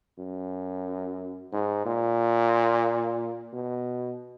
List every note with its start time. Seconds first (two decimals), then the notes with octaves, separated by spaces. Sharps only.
0.19 F#2
1.53 G#2
1.86 A#2
3.53 B2